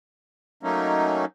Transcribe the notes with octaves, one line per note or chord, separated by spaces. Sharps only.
F#3 A3 A#3 C#4 D#4